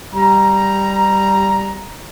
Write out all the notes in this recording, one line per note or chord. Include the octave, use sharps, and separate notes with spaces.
G3 A#5